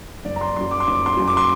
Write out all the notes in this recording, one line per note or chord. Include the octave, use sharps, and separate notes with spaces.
F#1 D5
A#5
C6
F#2 F#3 C6
D6
C6
F#1 D6
C6
F#2 F#3
D6
C6